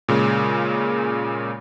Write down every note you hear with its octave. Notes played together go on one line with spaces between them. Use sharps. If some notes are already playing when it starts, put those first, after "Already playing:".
A#2 C#3 G#3